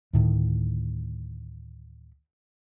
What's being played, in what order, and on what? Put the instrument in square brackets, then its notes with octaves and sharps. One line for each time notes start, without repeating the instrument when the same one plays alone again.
[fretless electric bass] D2 A2 D#3